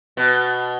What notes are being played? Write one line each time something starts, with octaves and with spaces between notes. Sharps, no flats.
B2